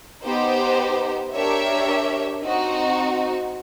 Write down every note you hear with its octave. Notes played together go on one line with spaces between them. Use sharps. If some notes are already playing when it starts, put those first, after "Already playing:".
B3 D#4 G4 C5
D4 G4 A#4 C#5 E5
C4 D#4 F#4